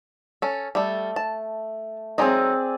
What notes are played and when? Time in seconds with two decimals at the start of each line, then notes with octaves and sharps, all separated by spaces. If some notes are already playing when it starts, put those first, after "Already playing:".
0.42 C#4 A4
0.75 G3 A3 A4
1.16 A5
2.18 F#3 G#3 C4 D#4 G#4 D5